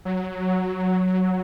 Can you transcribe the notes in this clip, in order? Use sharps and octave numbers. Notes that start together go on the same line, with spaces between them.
F#3